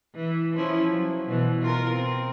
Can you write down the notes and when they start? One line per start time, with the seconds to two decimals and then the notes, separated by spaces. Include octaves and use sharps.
0.15 E3
0.57 F3 C#4 E4
0.92 F#3
1.25 B2 E3
1.63 F4 A#4
1.96 C4